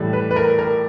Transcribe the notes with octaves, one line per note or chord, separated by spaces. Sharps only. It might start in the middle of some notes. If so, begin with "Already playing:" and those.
Already playing: A2 E3 G3
B4
B4
A#4
A#4